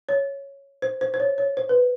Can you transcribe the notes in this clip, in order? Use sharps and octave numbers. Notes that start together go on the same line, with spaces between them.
C#5
C5
C5
C5
C#5
C#5
C5
B4